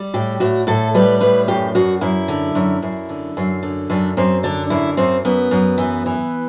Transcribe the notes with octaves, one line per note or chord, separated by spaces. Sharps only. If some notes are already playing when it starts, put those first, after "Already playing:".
Already playing: G3
A2 G4
A2 F#4
A2 A4
G3 B4
A2 B4
F#2 G4
F#2 F#4
F#2 E4
D3
F#2
F#2
D3
F#2
D3
F#2 D4
F#2 C4
D3 D4
F#2 E4
F#2 C4
F#2 B3
F#2
E3
E3